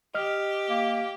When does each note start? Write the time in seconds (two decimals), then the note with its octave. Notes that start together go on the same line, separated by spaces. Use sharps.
0.15 G4 D#5 F6
0.70 A#3